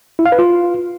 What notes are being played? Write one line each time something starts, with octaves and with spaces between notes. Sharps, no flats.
E4
F5
B4
F4